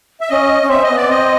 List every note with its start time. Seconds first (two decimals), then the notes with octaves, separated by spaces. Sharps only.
0.21 E5
0.29 C#4 D#5
0.63 C#4
0.69 C4 E5
0.83 D#5
0.89 B3
0.96 D5
1.09 C4 D#5